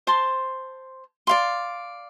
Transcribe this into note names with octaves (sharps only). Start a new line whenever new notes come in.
C5 A5 C6
D5 F5 C6